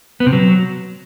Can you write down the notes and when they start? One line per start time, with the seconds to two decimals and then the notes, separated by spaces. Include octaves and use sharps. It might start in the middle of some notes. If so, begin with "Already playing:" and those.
0.20 B3
0.26 C3
0.33 F#3